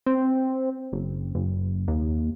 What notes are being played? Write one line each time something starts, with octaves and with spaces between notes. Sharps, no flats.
C4
F#1
F#1
D#2